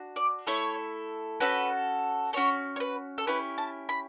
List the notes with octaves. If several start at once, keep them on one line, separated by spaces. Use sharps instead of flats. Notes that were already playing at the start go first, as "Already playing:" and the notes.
Already playing: D4 F#4
D5
A3 E4 A4 C#5
C#4 F#4 A4 B4
C#4 F#4 A4 C#5
C#5
B4
A4
C#4 E4 G4 B4
A5
B5